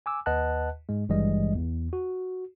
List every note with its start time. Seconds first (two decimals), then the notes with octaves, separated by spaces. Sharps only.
0.06 G#5 D6 E6
0.26 D#2 B4 D#5 F#5 A5 F#6
0.89 G#2 G#3
1.09 G#1 G2 E3 G3 G#3 D#5
1.55 E2
1.93 F#4